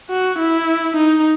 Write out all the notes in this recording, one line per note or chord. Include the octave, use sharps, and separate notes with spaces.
F#4
E4
D#4